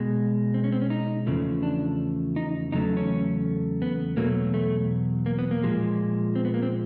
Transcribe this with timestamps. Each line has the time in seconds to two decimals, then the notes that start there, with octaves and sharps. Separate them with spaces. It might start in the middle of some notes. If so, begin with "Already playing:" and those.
Already playing: B2 G#3
0.54 C4
0.64 C#4
0.72 C4
0.81 C#4
0.90 D#4
1.27 E2 C#3 F3 A3
1.63 D4
2.36 D#4
2.72 E2 C#3 F#3 A3 D#4
2.97 C#4
3.82 B3
4.17 E2 B2 F#3 A3 A#3
4.54 A3
5.26 A#3
5.39 B3
5.51 A#3
5.63 A#2 F3 G#3
6.35 C4
6.45 B3
6.54 A#3
6.63 C4